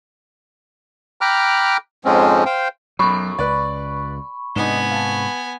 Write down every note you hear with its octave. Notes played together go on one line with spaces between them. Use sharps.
G5 A#5 B5 D6 F6 F#6
F2 G#2 F3 G#3 C4 C#4
C5 F5 G5
B1 F#2 F#3 B5 C#6
C#2 B4 D5
G#2 C3 B3 D4 D#4 G#5
F5 A5